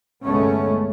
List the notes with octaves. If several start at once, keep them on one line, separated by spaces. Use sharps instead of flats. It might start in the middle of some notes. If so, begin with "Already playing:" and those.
G1 C2 G#3 A3 B3 C#4